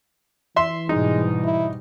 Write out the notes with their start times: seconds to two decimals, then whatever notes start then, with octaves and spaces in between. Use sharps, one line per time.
0.56 E3 E5 C6
0.89 G#2 B2 G3 G#3 D#4
1.44 E4